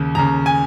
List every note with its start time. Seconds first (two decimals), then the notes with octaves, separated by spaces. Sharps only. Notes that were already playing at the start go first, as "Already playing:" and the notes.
Already playing: D#2 C#3
0.15 D#2 C#3 A#5
0.46 G#5